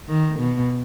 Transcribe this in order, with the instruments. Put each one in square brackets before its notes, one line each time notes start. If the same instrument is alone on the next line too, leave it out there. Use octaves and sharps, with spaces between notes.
[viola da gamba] D#3
B2